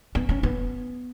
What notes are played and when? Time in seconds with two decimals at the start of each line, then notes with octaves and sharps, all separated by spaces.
0.15 B3
0.29 C#4
0.43 B3